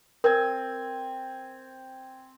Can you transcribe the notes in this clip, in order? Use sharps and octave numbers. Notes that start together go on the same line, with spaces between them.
C4 A#4 G#5